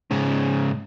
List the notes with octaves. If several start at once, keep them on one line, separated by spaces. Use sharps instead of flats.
G#2 C#3